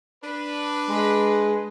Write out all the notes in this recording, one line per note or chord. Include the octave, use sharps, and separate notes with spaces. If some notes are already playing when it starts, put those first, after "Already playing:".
D4 B4
G#3